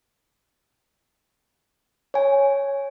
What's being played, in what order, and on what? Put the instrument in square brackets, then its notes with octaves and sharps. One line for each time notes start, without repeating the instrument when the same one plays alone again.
[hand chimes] C#5 G#5